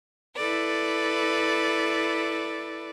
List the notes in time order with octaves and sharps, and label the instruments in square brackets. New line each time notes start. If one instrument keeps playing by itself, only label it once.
[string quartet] E4 A4 B4 D5